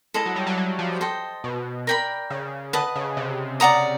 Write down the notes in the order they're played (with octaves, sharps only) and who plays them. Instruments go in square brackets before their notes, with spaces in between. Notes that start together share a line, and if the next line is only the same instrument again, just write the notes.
[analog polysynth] G#3 [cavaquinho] E4 A4 C5 D#5
[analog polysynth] F#3
G3
F#3
F#3
F3
[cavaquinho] A4 C5 D#5 G5
[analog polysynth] B2
[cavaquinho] A#4 D5 G5 B5
[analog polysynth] C#3
[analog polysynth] D3 [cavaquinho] B4 D#5 F#5 A5
[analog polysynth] C#3
C3
[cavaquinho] D5 F#5 A#5 D#6